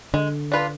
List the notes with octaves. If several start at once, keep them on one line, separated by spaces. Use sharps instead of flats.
D3 G#3
D4 F4 B4